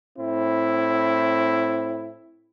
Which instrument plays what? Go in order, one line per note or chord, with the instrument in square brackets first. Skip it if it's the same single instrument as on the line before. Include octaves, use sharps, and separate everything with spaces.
[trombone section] A2 C4 E4